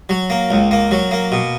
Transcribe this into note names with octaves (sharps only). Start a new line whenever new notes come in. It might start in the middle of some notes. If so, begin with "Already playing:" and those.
F#3
A#3
C#2
A#3
F#3
A#3
B2